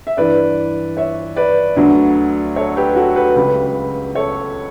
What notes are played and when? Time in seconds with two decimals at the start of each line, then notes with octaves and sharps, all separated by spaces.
0.07 E5
0.17 G2 E3 B4 D5
0.97 C#5 E5
1.36 B4 D5
1.76 D2 D3 F#3
2.56 A4 C#5
2.76 G4 B4
2.96 F#4 A4
3.16 G4 B4
3.36 C#2 C#3 F#3 G4 B4
4.15 A4 C#5